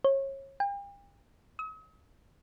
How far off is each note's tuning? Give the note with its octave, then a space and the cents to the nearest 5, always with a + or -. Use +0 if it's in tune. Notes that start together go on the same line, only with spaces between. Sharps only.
C#5 -30
G5 +40
D#6 +45